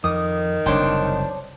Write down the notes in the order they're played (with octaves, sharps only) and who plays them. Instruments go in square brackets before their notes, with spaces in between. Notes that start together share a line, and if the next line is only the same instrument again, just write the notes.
[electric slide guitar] F2 [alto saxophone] D#3 [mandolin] D#6
[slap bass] F#1 C2 [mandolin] D4 C6 F#6 [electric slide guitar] C5 C#5 G5